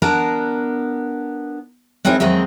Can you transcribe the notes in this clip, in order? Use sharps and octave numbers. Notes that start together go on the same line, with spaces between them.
B3 D4 A#4 A5 A#5
G#3 C4 D#4 E4 A#4 C#5
F2 D#3 F#3 G#3 C4